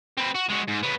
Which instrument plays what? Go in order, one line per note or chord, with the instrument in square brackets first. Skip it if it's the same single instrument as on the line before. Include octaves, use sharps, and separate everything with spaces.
[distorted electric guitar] C4 B4
F#4
G#3 F#4
G#2
C#3 B3